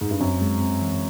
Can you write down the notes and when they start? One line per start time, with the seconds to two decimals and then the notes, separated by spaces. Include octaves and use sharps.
0.01 G#2
0.11 G2
0.20 F#2 C4
0.41 G#3
0.61 C4
0.81 E3